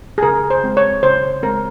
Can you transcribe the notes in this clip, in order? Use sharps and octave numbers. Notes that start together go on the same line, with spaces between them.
G#4
C#3 A#4
C5
G#3 C4
C#5
C#3 C5
G#3 C4 A#4